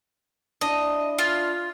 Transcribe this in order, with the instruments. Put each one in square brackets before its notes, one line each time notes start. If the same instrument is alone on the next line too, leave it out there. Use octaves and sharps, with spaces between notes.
[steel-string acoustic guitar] D4 E4 [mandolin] D#5
[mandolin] F4